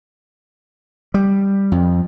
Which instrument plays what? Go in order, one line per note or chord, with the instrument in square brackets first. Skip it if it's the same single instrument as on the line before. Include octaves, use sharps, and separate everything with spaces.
[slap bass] G3
F2